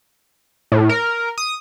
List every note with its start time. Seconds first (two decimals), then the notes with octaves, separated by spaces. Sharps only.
0.72 A2
0.89 A#4
1.38 D#6